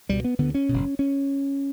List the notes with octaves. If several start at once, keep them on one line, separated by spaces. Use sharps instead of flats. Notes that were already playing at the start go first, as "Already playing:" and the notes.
C#2 B2 G3
B3
D2 D3 B3
C#4
F#1 E2 B2
C#4